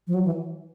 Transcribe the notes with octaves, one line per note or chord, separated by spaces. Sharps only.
F3
F#3
E3